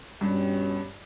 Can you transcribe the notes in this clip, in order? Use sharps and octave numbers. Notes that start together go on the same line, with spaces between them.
G2 B2 C#4 G4